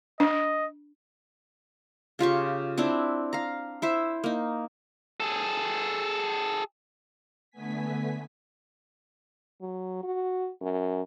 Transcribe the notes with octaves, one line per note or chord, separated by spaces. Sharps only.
D4 D#5
C#3 F4 G4 C#6
C4 D4 E4
F5 A#5
E4 C5 E5
A#3 D#4
G#4 A4
D3 A3 B3 G#5 B6
F#3
F#4
F#2